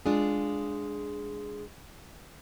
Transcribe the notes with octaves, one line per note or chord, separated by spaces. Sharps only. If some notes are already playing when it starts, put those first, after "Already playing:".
G#3 D4 F4 G#4